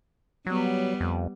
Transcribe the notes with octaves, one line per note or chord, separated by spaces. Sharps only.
F#3 G3 B3
F2